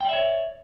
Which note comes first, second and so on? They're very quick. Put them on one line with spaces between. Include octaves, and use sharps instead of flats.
G5 D5 E5 C#5